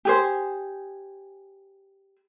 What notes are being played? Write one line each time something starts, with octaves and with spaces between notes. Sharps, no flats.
G4 G#4 C5